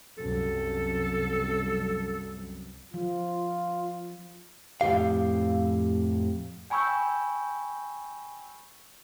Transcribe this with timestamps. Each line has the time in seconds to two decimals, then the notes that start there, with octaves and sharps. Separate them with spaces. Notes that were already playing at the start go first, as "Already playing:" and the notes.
0.18 C2 F#2 A4
2.94 F3 F4
4.81 F2 A2 C#3 G4 F5
6.70 G5 G#5 B5 C#6 E6 G6